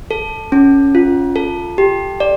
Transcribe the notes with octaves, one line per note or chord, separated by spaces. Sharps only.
A4
C#4
F4
A4
G4
D5